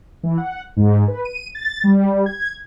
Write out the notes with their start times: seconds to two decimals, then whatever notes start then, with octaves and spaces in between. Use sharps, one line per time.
0.23 E3
0.37 F#5
0.77 G#2
1.08 B4
1.25 D#7
1.55 A6
1.84 G3
2.26 G#6